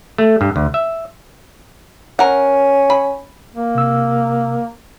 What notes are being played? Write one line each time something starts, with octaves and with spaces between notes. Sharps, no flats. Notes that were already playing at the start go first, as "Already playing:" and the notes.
A3
G2
D2
E5
C#4 A#4 F#5
B5
A#3
C3 E6